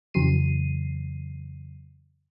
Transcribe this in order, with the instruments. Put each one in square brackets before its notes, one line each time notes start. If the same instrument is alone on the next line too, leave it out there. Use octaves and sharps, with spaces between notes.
[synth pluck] F2 C#3 E3 F#3 C7 D#7